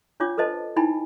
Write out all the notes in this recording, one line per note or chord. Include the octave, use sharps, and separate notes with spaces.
C#4 D4 F4 C#5 D6
A4 B4 C5 D#5 A5
D#4 E4 G5 G#5 B5